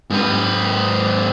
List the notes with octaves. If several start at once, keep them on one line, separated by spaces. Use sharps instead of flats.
G#2 B4